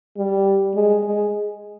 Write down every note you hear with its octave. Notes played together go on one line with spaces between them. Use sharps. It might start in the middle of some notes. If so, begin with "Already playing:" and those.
G3
G#3
G#3